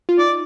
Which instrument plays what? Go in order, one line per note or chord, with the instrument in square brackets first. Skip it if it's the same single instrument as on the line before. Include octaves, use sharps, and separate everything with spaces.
[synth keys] F4
[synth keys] D#4 [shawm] D5